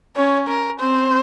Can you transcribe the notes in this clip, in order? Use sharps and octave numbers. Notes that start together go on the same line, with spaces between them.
C#4 C#5
A#4
C4 C5